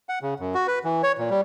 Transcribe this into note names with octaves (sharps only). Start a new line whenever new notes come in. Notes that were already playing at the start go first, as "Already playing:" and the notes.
F#5
C#3
F#2
F#4
B4
E3
C#5
A#2
G3